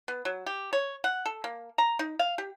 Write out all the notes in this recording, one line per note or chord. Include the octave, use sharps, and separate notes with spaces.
B3
F#3
G4
C#5
F#5
A4
A#3
A#5
D#4
F5
G4